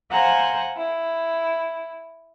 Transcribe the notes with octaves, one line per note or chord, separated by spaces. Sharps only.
C5 F5 F#5 G#5 A#5
E4